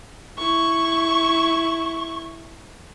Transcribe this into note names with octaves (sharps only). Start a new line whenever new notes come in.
E4 C#6